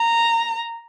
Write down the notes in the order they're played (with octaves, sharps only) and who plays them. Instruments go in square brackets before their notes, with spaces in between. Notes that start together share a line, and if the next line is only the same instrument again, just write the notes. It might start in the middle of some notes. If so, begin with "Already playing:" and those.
Already playing: [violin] A#5